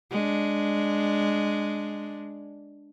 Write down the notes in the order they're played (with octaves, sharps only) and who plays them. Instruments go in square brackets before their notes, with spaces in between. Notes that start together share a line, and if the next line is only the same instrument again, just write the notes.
[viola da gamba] G#3 D4